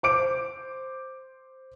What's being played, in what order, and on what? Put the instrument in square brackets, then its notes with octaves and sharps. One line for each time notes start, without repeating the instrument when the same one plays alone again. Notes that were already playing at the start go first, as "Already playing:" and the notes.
[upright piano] C5 D6 D7